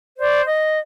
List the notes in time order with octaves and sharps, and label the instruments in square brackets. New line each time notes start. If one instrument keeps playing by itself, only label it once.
[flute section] C5 D5
D#5